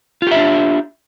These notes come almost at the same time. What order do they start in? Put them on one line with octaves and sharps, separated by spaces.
F4 G4 E5 D4